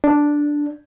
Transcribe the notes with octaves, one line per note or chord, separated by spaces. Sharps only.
D4